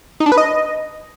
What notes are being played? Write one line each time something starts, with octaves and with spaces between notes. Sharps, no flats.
D#4
D4
B4
D#5